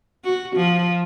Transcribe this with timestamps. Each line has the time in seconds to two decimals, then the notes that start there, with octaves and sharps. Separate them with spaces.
0.24 F#4
0.56 F3